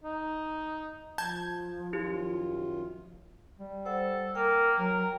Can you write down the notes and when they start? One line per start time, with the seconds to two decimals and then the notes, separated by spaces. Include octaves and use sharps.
0.04 D#4
1.18 F3 A5 G6 G#6
1.93 F#2 D#3 E4 F4 G4
3.59 G3
3.86 A4 C5 F#5
4.35 A#3 A#4 G5
4.78 F#3 A#4